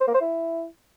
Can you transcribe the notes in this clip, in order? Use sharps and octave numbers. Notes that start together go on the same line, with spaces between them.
C5
A#3
C5
E4